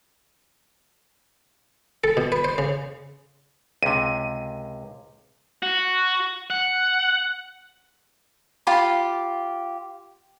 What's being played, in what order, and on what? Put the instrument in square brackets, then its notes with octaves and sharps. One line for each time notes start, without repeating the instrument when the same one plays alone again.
[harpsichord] A4
B2
B4
C5
C#3
[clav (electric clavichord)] C#2 C3 [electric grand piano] D#7
[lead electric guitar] F#4
F#5
[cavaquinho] F4 G4 B5